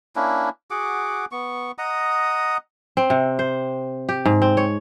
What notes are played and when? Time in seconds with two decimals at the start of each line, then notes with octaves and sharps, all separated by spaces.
0.16 A#3 C#4 D4 E4
0.71 F#4 G#4 F#5 D6
1.32 B3 C#6
1.78 D#5 F#5 A#5 D#6
2.97 C4
3.10 C3
3.39 C5
4.09 G4
4.25 G#2
4.42 C4
4.57 C#5